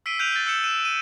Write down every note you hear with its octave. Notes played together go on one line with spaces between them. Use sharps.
E6 B6 C7 D7 D#7 G7
F#6 G6 B6 D7 D#7 F7
A6 G7
E6 G6 C#7 E7
E6 F#6 D#7 E7
D#7